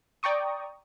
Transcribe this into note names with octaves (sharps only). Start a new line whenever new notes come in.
D5 G5 A#5 C#6 D#6